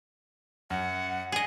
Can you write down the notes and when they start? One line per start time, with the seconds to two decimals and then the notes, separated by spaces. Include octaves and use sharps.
0.70 F#2 F#5
1.32 G#4 D#5